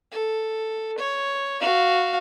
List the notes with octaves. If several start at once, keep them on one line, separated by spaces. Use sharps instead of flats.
A4
C#5
F#4 F5